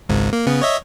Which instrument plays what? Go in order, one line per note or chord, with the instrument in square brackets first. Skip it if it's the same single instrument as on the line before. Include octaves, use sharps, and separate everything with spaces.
[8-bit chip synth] G#1 C#2 G#2
A#3
C#3 B3
C#5 D#5 E5